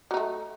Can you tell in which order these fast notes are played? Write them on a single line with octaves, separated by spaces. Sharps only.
F#3 D#4 A3